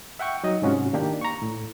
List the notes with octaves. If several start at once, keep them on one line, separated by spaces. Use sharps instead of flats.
E5 F#5 G5 C#6
F#3 D#4 D#5
G#2 C3 C#4 F4 F#4
D#3 A#3 D4 G4
A#5 C#6
A2